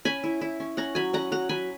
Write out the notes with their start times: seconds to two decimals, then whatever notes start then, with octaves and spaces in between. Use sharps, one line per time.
0.05 C#4 G#5 B5
0.24 E4
0.41 E4
0.60 C#4
0.77 C#4 F#5 A#5
0.95 F#3 G#5 B5
1.13 C#4 F#5 A#5
1.32 F#3 F#5 A#5
1.49 F#3 G#5 B5